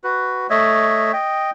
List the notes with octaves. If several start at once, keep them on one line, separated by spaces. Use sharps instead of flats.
F#4 B4
A3 C#5 D#5 E5
D#5 G5